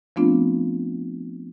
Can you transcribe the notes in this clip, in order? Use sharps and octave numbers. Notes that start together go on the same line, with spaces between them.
F3 A3 B3 C4 D4 F4